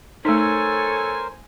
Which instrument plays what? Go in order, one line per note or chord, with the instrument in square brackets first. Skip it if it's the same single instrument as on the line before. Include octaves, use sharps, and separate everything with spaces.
[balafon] A3 D#4 [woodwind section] A4 C#5 [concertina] A#4 C5 [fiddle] G#5